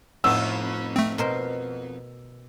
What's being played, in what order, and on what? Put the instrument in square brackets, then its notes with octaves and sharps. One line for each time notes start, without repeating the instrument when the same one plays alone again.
[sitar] F2 B3 D#4 [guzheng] A2 [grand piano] E6
[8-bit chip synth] A3 C4
[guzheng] B2 A#4 C5